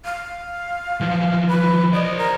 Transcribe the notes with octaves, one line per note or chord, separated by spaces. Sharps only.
F5
E3 F3
B4
C5 D5 D#5
A#4